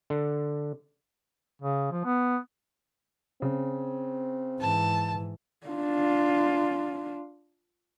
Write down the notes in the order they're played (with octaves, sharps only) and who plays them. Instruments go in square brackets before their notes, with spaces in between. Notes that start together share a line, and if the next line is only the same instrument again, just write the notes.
[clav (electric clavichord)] D3
[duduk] C#3
F3
B3
[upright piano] C#3 [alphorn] C4
[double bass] G#2 E3 [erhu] A5
[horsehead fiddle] D4 F4